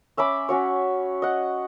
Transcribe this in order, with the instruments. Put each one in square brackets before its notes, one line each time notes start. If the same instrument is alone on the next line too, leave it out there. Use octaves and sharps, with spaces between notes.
[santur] C#4 E5 B5 D6
C#4 F#4 C#5
D#5 F#5